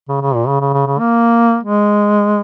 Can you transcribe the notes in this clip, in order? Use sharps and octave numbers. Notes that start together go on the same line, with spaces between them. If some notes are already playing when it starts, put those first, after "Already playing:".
C#3
C#3
A#2
C#3
C#3
C#3
C#3
A#3
G#3